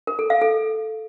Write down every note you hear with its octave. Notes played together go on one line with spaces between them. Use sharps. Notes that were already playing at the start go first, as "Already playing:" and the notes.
A#4
A4
F5
A4